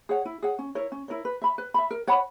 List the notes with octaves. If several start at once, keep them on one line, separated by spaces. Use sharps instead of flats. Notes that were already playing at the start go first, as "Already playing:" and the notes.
G#4 C#5 F#5
E4
G#4 C#5 F#5
C#4
E4 A#4 C#5
C#4
E4 A#4 C#5
B4
E5 B5
B4
E5 B5
A#4
C#5 F#5 B5